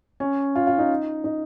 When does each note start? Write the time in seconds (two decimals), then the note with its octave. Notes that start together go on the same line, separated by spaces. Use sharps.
0.20 C#4
0.56 F4
0.67 F4
0.79 D#4
1.24 D#4